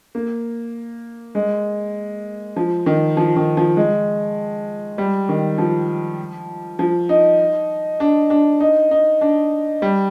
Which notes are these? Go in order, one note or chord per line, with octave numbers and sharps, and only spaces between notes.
A#3
G#3
F3
D#3
F3
D#3
F3
G#3
G3
D#3
F3
F3
D#4
D4
D4
D#4
D#4
D4
G3